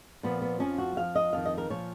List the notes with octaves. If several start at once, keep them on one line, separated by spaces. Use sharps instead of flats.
A#2 F3 B3
B3
F2 F3 C#4
F#4
F2 F3 F5
D#5
F2 D#3 F5
D#5
A#4
A#2 F3 C#5